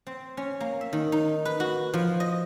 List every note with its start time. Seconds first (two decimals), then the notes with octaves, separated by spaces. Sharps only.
0.07 C4
0.37 C#4
0.60 A#3
0.81 E5
0.93 D#3
1.12 D#4
1.45 B4
1.60 F#4
1.94 F3
2.20 D#5